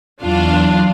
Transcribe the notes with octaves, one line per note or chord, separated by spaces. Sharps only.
E2 F#3 D4 F4 F5